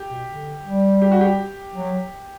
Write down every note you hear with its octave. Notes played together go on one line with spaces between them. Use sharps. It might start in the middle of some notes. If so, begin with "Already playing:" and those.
Already playing: G4
B2
D3
G3
G4
F#4
G4
F#3